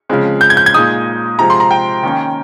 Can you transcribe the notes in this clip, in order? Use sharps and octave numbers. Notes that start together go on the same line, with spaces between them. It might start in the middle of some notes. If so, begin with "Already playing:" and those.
C#3 F3 G#3 C4
G6
G#6
G6
G#6
A#2 G#3 D#4 D#6
C3 F3 G#3 A#5
C6
A#5
G5
D#3 A#3 C#4